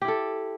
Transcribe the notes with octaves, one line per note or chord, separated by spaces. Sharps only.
E4 G4 A4